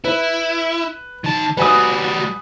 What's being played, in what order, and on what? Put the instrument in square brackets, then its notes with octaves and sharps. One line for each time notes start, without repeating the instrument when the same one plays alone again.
[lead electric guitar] E4 [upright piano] B4
[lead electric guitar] D#3 A5
[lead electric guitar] G3 F#4 [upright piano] B4 G#5 D#6